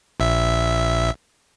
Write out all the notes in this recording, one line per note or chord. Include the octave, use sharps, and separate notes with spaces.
A#1 E5